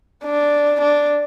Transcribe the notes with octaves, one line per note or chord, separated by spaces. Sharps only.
D4
D4